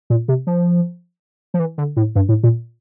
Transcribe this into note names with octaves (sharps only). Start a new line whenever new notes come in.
A#2
C3
F3
F3
E3
D3
A2
G2
A2
A#2